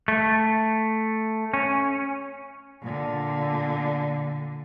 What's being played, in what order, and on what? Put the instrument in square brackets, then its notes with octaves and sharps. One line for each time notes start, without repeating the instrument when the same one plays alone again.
[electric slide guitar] A3
C#4
[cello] A#2 D3